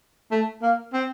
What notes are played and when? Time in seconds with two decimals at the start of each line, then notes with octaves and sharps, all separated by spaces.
0.31 A3
0.62 A#3
0.94 C4